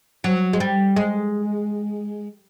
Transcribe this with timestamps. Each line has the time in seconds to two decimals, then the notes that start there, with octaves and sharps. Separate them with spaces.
0.24 F#3
0.53 G#3
0.60 G3
0.96 G#3